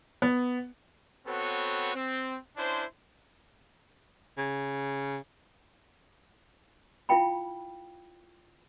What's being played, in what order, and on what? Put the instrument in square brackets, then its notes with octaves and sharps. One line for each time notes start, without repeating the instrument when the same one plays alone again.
[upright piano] B3
[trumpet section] B3 C4 F#4 A4 B4 C#5
C4
C#4 D4 E4 C5
[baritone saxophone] C#3
[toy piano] E4 F4 F5 G5 B5